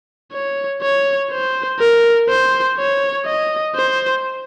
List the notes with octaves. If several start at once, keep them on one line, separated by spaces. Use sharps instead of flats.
C#5
C#5
C5
A#4
C5
C#5
D#5
C5